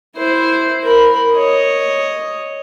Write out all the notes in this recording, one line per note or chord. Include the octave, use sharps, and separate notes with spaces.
E4 C5
A#4 B5
C#5 D#5